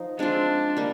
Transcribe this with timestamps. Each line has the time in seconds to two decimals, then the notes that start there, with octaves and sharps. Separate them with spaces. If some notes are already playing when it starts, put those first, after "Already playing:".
Already playing: F3 D#4
0.19 G#3 C4 D4 F4
0.77 G3 A#3